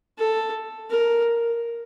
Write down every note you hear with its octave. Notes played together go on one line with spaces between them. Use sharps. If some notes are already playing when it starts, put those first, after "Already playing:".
A4
A#4